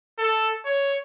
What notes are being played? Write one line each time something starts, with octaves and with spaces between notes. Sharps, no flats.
A4
C#5